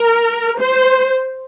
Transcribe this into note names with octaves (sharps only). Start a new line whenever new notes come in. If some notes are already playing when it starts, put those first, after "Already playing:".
Already playing: A#4
C5